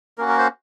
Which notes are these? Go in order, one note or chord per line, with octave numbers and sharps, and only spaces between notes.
A#3 C#4 F#4 A#4
A#4
C5